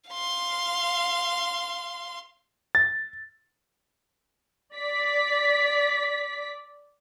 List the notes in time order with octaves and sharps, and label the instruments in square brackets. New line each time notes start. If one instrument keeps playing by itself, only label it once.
[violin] F5 C6
[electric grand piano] A6
[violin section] D5 B6